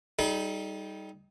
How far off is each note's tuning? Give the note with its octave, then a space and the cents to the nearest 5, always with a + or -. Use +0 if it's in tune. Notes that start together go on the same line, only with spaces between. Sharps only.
G3 +0 D#4 +10 A4 -45